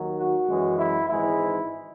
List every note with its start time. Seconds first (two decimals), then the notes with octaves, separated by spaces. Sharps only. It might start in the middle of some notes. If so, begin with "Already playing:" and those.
Already playing: D#2 D#3 F#3
0.18 F#4
0.48 F#2 E3 G#3
0.79 E4
1.09 G#1 G#2 E3 G#3 E4